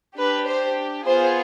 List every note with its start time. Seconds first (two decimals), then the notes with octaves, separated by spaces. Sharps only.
0.18 D4 G4 B4
0.47 C5
1.05 B3 F4 G#4 C5